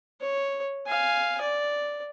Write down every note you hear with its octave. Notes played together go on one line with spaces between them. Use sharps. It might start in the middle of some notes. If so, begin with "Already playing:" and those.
C#5
F5 G#5
D5